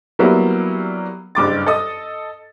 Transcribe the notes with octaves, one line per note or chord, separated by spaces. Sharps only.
F#3 G3 A#3 B3 E4
F#1 G2 D6 A6
A4 D#5 D#6